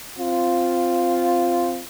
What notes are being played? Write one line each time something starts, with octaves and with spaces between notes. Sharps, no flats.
C4 F4